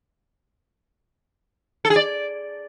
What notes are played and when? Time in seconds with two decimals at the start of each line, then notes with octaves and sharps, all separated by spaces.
1.85 A4
1.90 G#4
1.96 D5